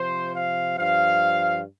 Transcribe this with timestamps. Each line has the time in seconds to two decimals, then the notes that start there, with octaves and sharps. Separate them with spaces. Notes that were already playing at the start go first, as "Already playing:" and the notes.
Already playing: C3 F3 C5
0.34 F5
0.77 G2 F3 F5